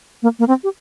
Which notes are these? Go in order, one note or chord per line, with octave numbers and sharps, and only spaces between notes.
A#3
A#3
C4
G4